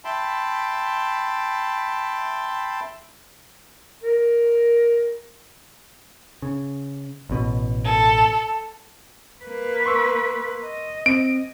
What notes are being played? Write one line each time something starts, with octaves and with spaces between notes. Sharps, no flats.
E5 G5 A5 B5 C6
A#4
C#3
A1 B2
A4
A#3 B4
C6 C#6 E6
D#5
C4 D7